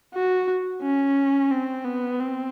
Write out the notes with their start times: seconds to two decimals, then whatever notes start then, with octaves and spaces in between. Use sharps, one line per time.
0.14 F#4
0.83 C#4
1.51 C4
1.85 B3
2.20 C4